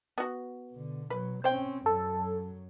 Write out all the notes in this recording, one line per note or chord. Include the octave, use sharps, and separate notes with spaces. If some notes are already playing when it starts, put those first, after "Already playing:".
B3 F#4
B2 D3
B2 F#3 B4
C4 C#4 C5 G5
F#2 F#3 A4